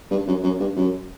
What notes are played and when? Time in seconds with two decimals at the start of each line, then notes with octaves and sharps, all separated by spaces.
0.11 G2
0.27 F#2
0.43 F#2
0.60 G2
0.76 F#2